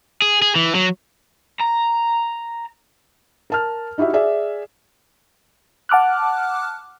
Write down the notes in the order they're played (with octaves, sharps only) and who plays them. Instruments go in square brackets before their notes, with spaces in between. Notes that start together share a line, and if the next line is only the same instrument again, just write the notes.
[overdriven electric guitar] G#4
G#4
E3
F#3
A#5
[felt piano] A#4 A5 F6
D#4 E4 F#4 G4 E5
G#4 D5 E5
[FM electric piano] F#5 A5 D6 F6 F#6